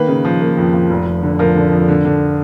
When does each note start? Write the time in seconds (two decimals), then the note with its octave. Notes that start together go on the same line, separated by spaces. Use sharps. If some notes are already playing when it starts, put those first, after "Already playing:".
Already playing: D#3 A#3 B4
0.08 C#3
0.25 F3
0.41 A#3
0.58 F2
0.74 F3
0.90 F1
1.06 F1
1.23 D3
1.39 F3 A#4
1.56 D3
1.72 F2
1.88 D3
2.05 D3